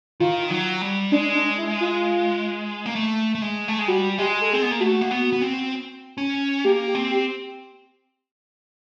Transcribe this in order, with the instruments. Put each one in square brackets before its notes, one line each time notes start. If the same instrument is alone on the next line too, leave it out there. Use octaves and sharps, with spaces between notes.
[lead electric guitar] D#3 [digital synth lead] F4
[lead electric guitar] F#3
G3
[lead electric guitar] G#3 [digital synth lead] D4
[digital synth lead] D4
E4
F4
[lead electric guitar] A#3
A3
A3
G#3
A3
G#3
[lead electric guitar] G3 [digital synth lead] F#4
[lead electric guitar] G#3 [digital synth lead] G4
[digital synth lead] A4
[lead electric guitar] C4 [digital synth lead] G#4
[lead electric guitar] B3
A#3
[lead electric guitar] A3 [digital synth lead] F#4
[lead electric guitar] A#3
B3
B3
C4
C#4
[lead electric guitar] A#3 [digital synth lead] G4
[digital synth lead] G4
[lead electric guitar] C4
[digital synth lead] G4